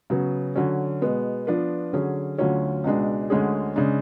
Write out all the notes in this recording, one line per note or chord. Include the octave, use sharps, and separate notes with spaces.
C#3 F#3 B3
D3 F#3 C#4
B2 G#3 B3
F3 B3 D4 F4 B4
D3 F#3 C#4 G#4
D2 D3 F#3 C#4 F4
C#2 B2 G#3 D4
D2 D3 G#3 C#4 G#4
C#3 G#3 D4